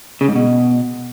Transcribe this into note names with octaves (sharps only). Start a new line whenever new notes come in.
C#3
G#2
B2